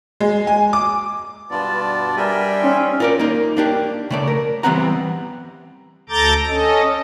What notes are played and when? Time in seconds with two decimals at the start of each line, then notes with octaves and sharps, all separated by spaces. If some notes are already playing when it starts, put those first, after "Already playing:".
0.20 G#3
0.47 G#5
0.73 D6
1.51 G2 B2 B3 F4 B4 D5 A5
2.17 G3 D4 A#4 E5 G5 G#5
2.63 C#4 D#4 C5 F5
3.00 F4 A#4 D5
3.19 A#3 D#4
3.57 A#3 D4 G4
4.11 C#3 A3 D5
4.28 A#4
4.63 E3 G3 B3 C4 F#5 A#5
6.09 D2 A4 A#5 D6 G6 A6
6.48 C#4 A4 D#5